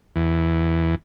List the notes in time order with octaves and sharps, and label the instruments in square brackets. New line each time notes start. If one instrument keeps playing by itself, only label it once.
[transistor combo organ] E2